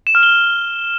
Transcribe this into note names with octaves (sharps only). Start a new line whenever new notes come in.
E7
F6
G7